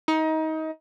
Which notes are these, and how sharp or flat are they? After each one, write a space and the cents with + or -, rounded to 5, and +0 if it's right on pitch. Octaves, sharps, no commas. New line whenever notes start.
D#4 +25